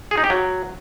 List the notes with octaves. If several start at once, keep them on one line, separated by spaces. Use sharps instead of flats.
G#4
D#4
G4
F#3